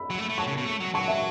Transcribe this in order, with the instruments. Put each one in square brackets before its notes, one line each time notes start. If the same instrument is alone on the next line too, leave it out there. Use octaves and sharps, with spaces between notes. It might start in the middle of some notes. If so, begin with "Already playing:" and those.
Already playing: [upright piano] B5 E6
[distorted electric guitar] F#3
A3
A3
[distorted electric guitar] F#3 [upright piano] A5 C#6
[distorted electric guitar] C#3
B2
A3
F#3
[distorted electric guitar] F#3 [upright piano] A5 C#6
[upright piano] E5 A5